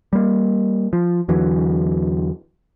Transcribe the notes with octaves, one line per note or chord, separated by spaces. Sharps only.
G3 A#3
F3
E2 D3 E3 F#3